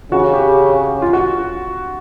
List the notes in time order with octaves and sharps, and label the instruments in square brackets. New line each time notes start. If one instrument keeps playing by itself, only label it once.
[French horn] C#3 [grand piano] F#4
[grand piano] G4
F4
F#4